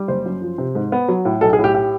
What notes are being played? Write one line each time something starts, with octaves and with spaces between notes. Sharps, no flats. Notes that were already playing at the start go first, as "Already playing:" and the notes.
Already playing: G3
F#1 C5
F#2
F3
C3
G#2
B3
F#3
A2
B1 A4
G#4
A2
G4
G4